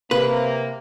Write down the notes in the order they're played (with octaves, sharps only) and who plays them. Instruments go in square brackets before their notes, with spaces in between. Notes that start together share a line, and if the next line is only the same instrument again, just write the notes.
[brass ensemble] C3 A#3 [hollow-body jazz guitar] B4